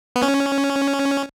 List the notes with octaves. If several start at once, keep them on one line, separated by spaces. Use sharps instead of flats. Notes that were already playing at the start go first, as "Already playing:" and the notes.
B3
C#4